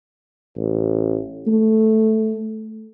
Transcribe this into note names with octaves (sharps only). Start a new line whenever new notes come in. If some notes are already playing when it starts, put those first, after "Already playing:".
A1
A3